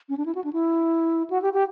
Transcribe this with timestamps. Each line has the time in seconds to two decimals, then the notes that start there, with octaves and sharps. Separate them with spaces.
0.09 C#4
0.18 D4
0.26 E4
0.35 F#4
0.44 D4
0.53 E4
1.30 F#4
1.42 G4
1.53 G4